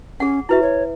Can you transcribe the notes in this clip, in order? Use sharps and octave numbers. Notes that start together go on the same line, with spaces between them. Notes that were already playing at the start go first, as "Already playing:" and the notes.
C#4 G#4 F#5
E4 F#4 B4 E5
C#5